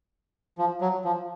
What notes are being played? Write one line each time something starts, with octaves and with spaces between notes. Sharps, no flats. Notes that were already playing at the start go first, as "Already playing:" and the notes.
F3
F#3
F3